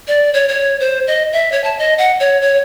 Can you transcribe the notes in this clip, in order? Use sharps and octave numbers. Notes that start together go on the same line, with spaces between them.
D5
C#5
C#5
C5
D#5
E5
C#5
A5
D#5
F#5
C#5
C#5